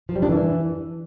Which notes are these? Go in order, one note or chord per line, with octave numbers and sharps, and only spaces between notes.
F3
G3
D4
E3